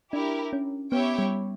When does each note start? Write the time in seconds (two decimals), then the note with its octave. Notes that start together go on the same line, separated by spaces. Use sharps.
0.13 D4 E4 G4 A#4
0.53 C#4
0.92 B3 E4 G4 C#5 E5 G5
1.19 G3